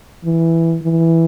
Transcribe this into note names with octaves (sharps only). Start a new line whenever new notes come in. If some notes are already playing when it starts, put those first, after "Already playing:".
E3
E3